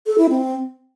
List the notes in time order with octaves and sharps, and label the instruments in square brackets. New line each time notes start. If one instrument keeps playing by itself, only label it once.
[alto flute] A4
E4
C4